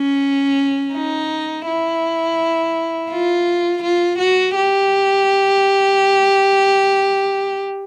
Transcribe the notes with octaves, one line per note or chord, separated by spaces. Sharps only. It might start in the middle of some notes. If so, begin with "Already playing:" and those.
Already playing: C#4
D#4
E4
F4
F4
F#4
G4